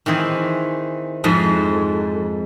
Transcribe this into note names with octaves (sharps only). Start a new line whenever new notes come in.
D#3 E3 C4 G#4
F2 G#2 G#3